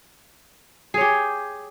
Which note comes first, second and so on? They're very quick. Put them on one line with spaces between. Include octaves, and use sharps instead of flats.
G#4 C#5 G4